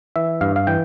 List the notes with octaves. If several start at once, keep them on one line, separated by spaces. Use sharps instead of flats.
E3 E5
G2 F5
F5
E3 G5